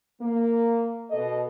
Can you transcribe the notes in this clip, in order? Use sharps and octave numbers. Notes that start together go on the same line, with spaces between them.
A#3
B2 A4 D#5